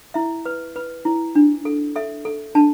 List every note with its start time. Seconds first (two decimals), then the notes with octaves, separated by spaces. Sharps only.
0.14 E4 E5
0.46 B4
0.76 B4
1.05 E4
1.35 D4
1.65 A4
1.96 A4 E5
2.25 A4
2.55 D4 A5